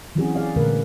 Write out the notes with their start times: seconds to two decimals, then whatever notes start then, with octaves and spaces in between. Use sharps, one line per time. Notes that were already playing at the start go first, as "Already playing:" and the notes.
0.15 E3 F#3 C4 C#4 F#4 G#4
0.35 G#4 D5 F5
0.56 A#2 D3 G#3 A3 A#4 B4